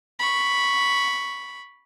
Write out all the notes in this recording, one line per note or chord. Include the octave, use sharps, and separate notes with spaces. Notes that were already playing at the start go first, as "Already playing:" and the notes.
B5 C#6